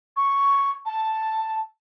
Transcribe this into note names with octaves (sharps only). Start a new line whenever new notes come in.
C#6
A5